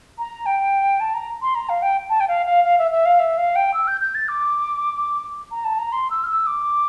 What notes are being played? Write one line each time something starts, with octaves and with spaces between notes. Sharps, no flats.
A#5
G5
A5
A#5
C6
A#5
F5
G5
A5
G5
F5
F5
F5
E5
E5
F5
E5
F5
G5
E6
G6
G6
A6
D6
A#5
A5
A#5
C6
E6
F6
E6
D6